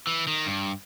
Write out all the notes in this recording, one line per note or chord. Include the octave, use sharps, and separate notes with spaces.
E3
D#3
G2